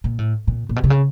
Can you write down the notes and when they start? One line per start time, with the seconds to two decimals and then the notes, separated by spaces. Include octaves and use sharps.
0.04 A#2
0.19 A2
0.47 A#2
0.69 A#2
0.76 B2
0.84 C3
0.90 C#3